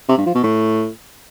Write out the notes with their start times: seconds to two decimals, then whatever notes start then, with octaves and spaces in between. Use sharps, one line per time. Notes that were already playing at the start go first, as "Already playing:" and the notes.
0.09 C3
0.18 G2
0.26 F3
0.35 B2
0.44 A2